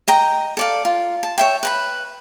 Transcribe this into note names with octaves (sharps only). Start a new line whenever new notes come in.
D#5 G5 A#5
A4 D5 F5
F4
A5
C#5 E5 G5
B4 A5 B5